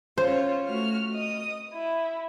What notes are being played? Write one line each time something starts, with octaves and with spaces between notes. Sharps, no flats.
C#4 F4 C5 C#5
A3 F#4 F6
D#5 D#6
E4